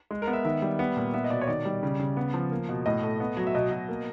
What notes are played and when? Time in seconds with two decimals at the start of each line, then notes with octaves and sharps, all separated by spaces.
0.11 G#3
0.22 A#4
0.27 B3
0.33 E5
0.44 D#3 E5
0.62 G3
0.79 B3
0.97 A#2
1.14 B3 E5
1.24 D#5
1.30 B2 D5
1.41 C#5
1.48 D#3 D5
1.65 G3
1.83 C#3
1.99 C#3
2.17 B3
2.34 F3
2.52 A#3
2.69 B2
2.86 A2 D#5
3.03 A3
3.20 B3
3.37 F#3
3.47 E5
3.54 B2 D#5
3.71 B2
3.88 A#3